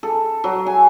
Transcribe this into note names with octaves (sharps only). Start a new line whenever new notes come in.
A4
F#3
G#5